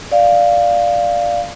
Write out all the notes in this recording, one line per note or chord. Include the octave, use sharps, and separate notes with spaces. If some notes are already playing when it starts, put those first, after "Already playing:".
D5 F5